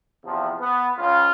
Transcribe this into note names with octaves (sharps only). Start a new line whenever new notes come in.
E2 C3 F3
B3
C#2 C#3 F3 F4